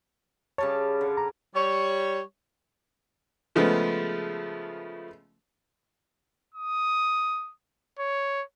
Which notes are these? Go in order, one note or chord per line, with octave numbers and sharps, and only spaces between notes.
C#3 G3 C#5 A5
D3
A#5
G3 C#5
C#3 F3 G#3 A3 B3
D#6
C#5